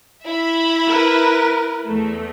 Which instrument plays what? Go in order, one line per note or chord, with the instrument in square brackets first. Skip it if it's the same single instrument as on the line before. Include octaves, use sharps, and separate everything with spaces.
[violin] E4 [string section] E5 B5
[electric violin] A#4 B4
[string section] E2 A3